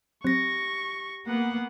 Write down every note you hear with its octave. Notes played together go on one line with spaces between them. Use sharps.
F#3 C4 G4 C#6 A#6
A#3 B3 F#5